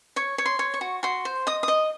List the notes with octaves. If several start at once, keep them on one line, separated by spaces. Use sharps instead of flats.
C#5 C#6
C#5
C6
C#5
C#6
F#4
F#4 C6
C5
D#5 D#6
D#5 D#6